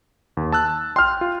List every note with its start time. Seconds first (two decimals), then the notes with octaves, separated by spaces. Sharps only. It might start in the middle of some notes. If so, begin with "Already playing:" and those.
0.37 D#2
0.52 A5 E6 F#6
0.96 G5 C6 F6
1.21 F4